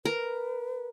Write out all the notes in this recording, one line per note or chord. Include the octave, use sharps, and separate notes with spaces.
A#4 B4